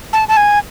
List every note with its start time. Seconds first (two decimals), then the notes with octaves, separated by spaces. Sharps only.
0.13 A5
0.28 A5
0.37 G#5